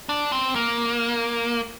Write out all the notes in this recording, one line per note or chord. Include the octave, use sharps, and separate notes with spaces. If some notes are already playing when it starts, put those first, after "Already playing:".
D4
C4
A#3